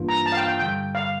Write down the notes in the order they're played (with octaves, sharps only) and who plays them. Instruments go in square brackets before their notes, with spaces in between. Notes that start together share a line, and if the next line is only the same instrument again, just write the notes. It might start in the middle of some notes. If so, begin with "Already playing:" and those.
Already playing: [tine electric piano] G2 E3 A#3 D4 F4
[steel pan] A#5
A5
F5
G5
G5
[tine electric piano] G2 D3 G3 [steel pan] G5
[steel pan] F5